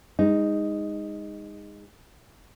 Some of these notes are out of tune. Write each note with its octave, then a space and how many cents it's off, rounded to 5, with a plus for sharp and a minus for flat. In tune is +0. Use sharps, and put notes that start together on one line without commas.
G#3 -30 D#4 +0